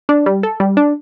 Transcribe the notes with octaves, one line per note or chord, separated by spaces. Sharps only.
D4
G3
A4
G3
D4